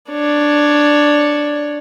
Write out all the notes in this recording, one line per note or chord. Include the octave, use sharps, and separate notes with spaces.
D4 C#5